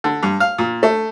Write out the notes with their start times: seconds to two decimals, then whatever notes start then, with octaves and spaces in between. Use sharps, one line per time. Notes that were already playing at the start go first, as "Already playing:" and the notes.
0.04 D3
0.23 G2
0.40 F5
0.58 A#2
0.83 A3